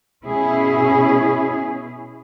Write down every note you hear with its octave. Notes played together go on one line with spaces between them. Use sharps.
B2 C#4 E4 G#4